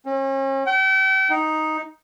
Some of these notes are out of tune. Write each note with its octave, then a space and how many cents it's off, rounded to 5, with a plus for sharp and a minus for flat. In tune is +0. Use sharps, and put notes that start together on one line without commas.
C#4 -40
G5 -40
D#4 +5